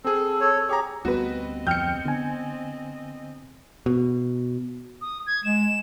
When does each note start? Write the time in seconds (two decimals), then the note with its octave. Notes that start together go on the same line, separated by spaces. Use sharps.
0.04 C4 G#4 A4
0.40 A4 C#5
0.69 G4 G#4 C#5 A#5
1.05 D2 G3 B3 C4 F#4 B4 D#5
1.67 F2 G5 F6 G6 C#7
2.05 D3 B3 G#5
3.86 B2
5.02 D#6
5.27 G#6
5.44 G#3 E7